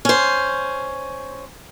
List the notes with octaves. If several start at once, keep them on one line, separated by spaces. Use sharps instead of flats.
C#4 C5